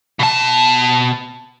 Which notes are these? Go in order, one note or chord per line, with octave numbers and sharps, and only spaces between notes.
B2 A5